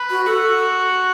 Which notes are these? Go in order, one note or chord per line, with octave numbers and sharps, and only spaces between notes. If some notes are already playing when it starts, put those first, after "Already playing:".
Already playing: B4
F#4
F#4 A4